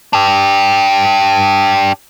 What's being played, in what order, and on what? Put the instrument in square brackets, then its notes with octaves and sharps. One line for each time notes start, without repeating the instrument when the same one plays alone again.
[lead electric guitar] D4 G4